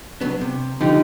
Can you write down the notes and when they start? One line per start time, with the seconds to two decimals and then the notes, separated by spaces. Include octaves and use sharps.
0.21 F#3 B3 D4
0.41 C3
0.81 D3 F3 D#4 G4